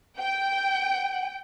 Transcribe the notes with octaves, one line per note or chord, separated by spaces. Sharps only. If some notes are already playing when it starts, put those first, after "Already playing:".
G5